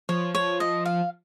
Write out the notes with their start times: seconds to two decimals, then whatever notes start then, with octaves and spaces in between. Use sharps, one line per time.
0.09 F3 C#5
0.35 C#5
0.60 D#5
0.86 F5